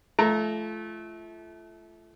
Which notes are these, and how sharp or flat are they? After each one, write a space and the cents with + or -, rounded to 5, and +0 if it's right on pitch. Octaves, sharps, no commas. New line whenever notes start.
F3 -35 A3 -25 A#5 +0